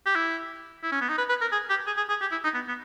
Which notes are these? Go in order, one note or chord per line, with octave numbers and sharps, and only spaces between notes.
G4
E4
E4
C#4
B3
D#4
B4
B4
A#4
G#4
G4
G#4
G#4
G#4
G4
E4
D#4
B3
B3